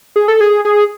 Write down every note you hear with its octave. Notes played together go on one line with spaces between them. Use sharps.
G#4
A4
G#4
G#4